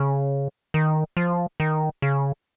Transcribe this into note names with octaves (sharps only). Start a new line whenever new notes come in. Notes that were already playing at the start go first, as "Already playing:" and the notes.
Already playing: C#3
D#3
F3
D#3
C#3